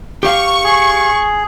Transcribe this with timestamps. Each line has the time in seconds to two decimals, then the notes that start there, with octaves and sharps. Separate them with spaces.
0.23 G4 F5 C#6
0.64 G#4